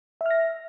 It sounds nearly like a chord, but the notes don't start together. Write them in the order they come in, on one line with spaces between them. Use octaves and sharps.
E5 F6 A#6